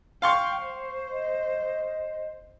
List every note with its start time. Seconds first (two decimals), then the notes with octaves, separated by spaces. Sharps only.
0.22 F5 G5 C6 C#6
0.64 C5
1.11 D#5